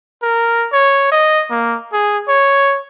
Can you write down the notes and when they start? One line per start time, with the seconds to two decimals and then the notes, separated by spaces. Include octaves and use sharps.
0.22 A#4
0.72 C#5
1.12 D#5
1.51 A#3
1.93 G#4
2.28 C#5